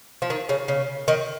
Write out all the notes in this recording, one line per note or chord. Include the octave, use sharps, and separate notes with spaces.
F3
D#3
C#3
C#3
D#3